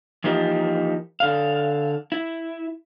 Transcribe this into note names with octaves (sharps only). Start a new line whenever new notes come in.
E3 F3 A#3 D#4 G4
D3 F5
E4